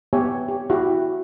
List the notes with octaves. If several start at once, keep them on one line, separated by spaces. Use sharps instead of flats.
B3 G4 C#5 E5 G#5
G4
E4 F#4 G4